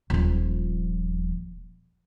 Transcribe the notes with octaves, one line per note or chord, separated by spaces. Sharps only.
D#1 F3